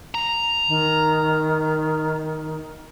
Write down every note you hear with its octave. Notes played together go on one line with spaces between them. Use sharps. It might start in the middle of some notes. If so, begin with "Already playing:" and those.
A#5
D#3